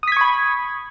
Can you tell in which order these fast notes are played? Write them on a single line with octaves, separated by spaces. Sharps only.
D#6 B6 G#6 C#6 B5